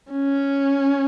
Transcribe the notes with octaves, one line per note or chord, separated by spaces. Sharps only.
C#4